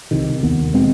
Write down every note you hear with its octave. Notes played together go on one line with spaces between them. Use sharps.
C2 C3 D#3
D#2 D#3 B3
B2 G#3 C4